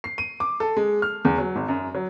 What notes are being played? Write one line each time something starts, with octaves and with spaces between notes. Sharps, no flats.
C7
D#7
D6
A4
G#3
F6
E2
F#3
G#1
F#2
F#3